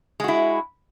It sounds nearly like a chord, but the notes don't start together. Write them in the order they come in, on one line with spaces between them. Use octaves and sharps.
G#3 F#4 E4